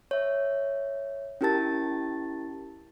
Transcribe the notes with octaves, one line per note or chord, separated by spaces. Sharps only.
C#5 E5
C#4 E4 G4 A#4 A5 A6